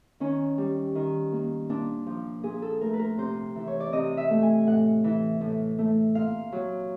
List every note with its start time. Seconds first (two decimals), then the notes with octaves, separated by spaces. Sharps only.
0.20 D#3 C#4
0.58 G3
0.95 D#3
1.32 A#3
1.69 A#2 D4
2.06 F3
2.43 A#2 G#4
2.62 A4
2.81 A3 A#4
2.93 B4
2.99 A#4
3.18 C3 C5
3.56 E3
3.68 C#5
3.80 D5
3.93 C3 D#5
4.17 E5
4.30 A3
4.42 G#5
4.67 A2 F#5
5.04 E3
5.41 A2
5.78 A3
6.15 A#2 F5
6.52 F#3